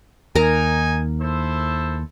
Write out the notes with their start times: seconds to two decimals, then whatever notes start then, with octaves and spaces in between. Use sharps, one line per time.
0.35 D#2 D#4 A#4 G#5 A#5
1.20 E4 A4 C5